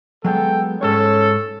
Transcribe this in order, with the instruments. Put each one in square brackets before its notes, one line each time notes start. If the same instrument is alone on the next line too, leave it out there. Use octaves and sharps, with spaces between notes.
[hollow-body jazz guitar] F#3 G#3 B3 [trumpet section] A4 G5
[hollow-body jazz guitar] G#2 G#3 C#5 [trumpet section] C#4 A4